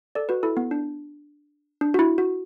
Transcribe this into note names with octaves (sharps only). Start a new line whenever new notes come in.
A4 D5
F#4 B4
E4 A4
B3
D4
D4
F#4
E4
F#4